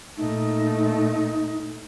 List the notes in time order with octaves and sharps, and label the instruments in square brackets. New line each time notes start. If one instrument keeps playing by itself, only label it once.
[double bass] A#2 A3 [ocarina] D#4